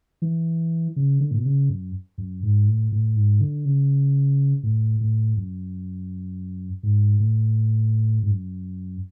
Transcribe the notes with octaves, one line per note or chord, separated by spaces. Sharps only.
E3
C#3
D3
A2
B2
C#3
F#2
F#2
G#2
A2
A2
G#2
D3
C#3
A2
A2
F#2
G#2
A2
G#2
F#2